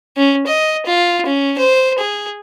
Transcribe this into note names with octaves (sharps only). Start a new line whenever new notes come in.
C#4
D#5
F4
C#4
C5
G#4